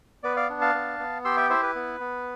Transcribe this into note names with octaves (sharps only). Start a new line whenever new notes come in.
B3 B4 D5
D5 F5
D4
F5 A5
B3
B3
G4 C6 E6
E5 G5
E4 C5 E5
B4
B3
B3